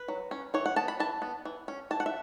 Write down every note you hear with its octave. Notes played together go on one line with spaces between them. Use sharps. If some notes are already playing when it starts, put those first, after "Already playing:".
Already playing: B4
F#3
C#4
E3 C#5
F#5
B3 A5
B5
E3 A5
B3
E3
C#4
E3 A5
F#5
E5